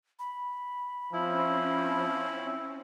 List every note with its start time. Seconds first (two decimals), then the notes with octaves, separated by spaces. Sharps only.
0.19 B5
1.13 F3 C4 C#4 E4